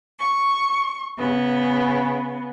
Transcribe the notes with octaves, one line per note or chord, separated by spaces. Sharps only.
C#6
C#3 B3